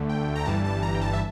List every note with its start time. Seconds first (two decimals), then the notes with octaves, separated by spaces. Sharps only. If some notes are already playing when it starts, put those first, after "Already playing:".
Already playing: D2 D3 A3
0.09 G5
0.36 A#5
0.45 G1 G2 E3 G3 A5
0.65 A5
0.83 A#5
0.94 G5
1.01 A5
1.13 E5